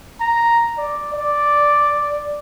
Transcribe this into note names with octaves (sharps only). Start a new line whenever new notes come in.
A#5
D5
D5